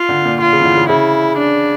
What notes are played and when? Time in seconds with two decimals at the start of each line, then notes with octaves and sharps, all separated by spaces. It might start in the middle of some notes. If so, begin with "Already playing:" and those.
Already playing: F4
0.09 D3
0.25 A#2
0.41 F4
0.53 C#3
0.60 E3
0.65 D3
0.77 C#3
0.89 C#3 E4
1.38 D4